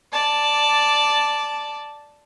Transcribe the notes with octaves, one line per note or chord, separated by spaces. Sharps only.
D5 A5